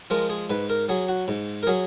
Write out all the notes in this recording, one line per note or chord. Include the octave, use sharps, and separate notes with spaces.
F3 G#3 A#4
G#4
G#2 B4
A#4
F#3 G#4
F#4
G#2
A#4
F#3 G#4